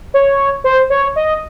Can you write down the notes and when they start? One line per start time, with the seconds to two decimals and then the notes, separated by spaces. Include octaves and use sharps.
0.14 C#5
0.64 C5
0.90 C#5
1.16 D#5